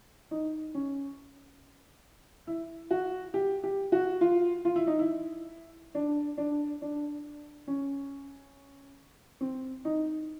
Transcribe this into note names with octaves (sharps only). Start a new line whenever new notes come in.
D#4
C#4
E4
F#4
G4
G4
F#4
F4
F4
E4
D#4
E4
D4
D4
D4
C#4
C4
D#4